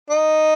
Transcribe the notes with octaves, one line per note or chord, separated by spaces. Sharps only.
D#4